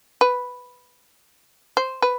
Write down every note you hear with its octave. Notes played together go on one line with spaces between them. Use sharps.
B4
C5
B4